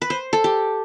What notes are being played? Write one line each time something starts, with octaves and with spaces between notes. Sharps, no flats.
B4
C5
A4
G4